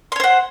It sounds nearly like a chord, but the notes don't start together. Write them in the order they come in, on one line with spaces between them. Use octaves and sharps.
C6 C#5 C5 F#5